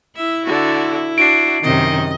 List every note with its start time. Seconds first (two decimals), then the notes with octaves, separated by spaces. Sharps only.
0.17 E4 E5
0.46 D3 F#4
1.18 D4 F#4 C7 D7
1.63 F#2 C3 D#3 D#5